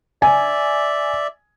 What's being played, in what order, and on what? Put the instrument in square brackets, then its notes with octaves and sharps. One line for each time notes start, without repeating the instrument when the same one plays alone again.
[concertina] D5 E5 [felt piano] G#5